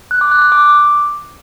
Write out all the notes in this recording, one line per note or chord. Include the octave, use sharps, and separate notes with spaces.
F#6
D6
F#6
F#6
D6